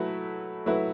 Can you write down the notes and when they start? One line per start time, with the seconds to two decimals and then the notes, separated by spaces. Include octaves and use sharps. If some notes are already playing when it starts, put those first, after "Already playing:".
Already playing: F#3 A3 E4 B4
0.66 F#3 A3 E4 B4